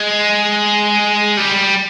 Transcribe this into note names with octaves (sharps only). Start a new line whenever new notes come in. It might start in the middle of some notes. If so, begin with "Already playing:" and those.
Already playing: G#3
G3